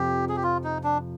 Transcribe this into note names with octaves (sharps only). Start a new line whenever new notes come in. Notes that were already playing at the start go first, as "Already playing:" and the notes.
Already playing: F2 C3 F3 G4
G#4
G4
F4
D#4
D4